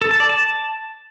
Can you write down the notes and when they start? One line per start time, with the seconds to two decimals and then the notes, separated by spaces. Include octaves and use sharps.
0.02 A4
0.11 A5
0.20 D5
0.29 A5